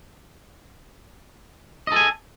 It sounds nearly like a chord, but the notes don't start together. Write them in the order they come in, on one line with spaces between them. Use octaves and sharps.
D#5 A4 G#5